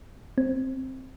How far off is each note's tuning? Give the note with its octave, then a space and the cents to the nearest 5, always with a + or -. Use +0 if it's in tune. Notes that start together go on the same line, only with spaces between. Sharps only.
C4 +5